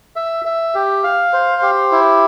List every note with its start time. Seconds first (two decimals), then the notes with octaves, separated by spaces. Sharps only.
0.16 E5
0.45 E5
0.75 G4
1.04 F5
1.33 C5
1.62 G4
1.92 E4